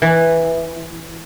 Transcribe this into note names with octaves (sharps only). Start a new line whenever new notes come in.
E3